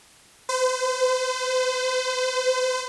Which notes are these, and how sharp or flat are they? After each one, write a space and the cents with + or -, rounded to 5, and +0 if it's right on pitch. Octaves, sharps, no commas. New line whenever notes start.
C5 -40